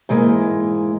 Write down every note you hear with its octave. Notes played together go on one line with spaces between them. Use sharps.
G#2 E3 G3 G#3 A#3